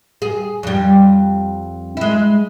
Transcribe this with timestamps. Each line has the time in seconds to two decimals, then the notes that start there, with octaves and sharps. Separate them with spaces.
0.22 G#4
0.63 F2 G3
1.97 G#3 E4